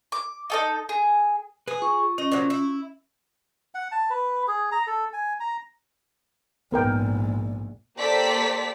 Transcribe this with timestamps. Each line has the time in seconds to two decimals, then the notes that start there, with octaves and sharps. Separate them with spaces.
0.12 D6
0.50 D#4 A4 D#5
0.89 G#4
1.68 G#4 B4 D#6
1.82 F4 C#6 D#6
2.18 C#4 D#5
2.32 A#2 F3 F#3
2.50 E4
3.75 F#5
3.92 A5
4.10 B4
4.48 G#4
4.72 A#5
4.87 A4
5.13 G#5
5.40 A#5
6.72 A#1 G#2 B3 A#4 G5
7.98 A#3 G4 A4 C5 D5 B6